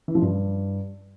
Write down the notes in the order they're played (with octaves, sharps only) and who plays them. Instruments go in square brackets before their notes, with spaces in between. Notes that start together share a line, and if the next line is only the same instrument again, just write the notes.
[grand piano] E3
F3
G2